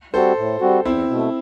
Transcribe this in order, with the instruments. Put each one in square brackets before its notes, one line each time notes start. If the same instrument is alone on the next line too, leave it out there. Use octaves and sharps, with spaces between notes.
[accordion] G3 C4 F#4 [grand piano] A4 C5
[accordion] A2
G3 C4 F#4
[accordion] E2 [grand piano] C4 E4
[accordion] B2
A3